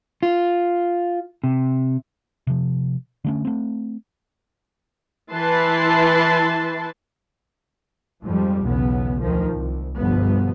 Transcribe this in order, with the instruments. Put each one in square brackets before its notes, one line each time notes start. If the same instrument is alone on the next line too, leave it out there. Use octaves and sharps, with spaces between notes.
[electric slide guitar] F4
C3
[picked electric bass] C3 F3
D3 A3 C#4
A3 C4
[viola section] E3 E4 B4 A5 C6
[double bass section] F2 G#2 F3 G3
B1 E2 C#3 B3
D2 D#3 F3
C2
G1 B2 F3 B3